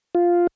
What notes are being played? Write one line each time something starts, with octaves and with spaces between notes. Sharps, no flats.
F4